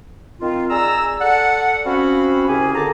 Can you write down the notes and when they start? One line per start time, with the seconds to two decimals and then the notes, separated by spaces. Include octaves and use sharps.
0.40 D#3 C4 F4
0.70 G#4 D5 A#5 E6
1.21 A4 D5 F#5
1.85 C4 C#4 F#4 F5 B5
2.48 C2 C#3 C#4 G4 G#4
2.75 A#2 D3 A5 A#5 D6